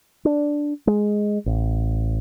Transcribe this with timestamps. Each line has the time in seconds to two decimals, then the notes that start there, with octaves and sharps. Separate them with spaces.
0.25 D4
0.87 G#3
1.46 A1